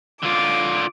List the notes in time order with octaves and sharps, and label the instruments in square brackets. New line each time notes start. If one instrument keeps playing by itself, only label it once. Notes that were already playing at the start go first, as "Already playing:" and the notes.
[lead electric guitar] D3 F4 [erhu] D6